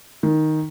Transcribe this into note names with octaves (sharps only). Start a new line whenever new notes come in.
D#3